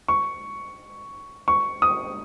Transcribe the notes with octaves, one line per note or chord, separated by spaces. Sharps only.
C#6
C#6
D#6